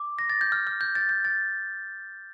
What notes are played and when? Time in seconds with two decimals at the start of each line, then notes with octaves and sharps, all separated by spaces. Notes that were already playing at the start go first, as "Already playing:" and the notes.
Already playing: D6
0.19 A#6
0.30 A6
0.41 G6
0.52 F6
0.67 F6
0.81 G6
0.95 A6
1.09 G6
1.25 A6